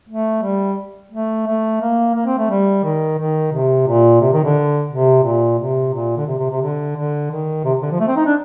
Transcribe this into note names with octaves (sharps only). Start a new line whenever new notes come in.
A3
G3
A3
A3
A#3
A#3
C4
A3
G3
D#3
D#3
C3
A#2
C3
D#3
D3
C3
A#2
C3
A#2
D3
C3
C3
C3
D3
D3
D#3
C3
D3
F3
A3
C4
D#4
D4